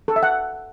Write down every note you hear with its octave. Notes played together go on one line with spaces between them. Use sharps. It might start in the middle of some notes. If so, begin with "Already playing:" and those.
A4
E5
F#5